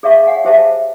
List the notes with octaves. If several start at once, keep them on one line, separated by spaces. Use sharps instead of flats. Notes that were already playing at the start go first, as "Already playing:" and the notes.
G#4 D5 E5 F5 C#6
C#5 F5 F#5 G#5
G4 G#4 C5 E5 F5 A5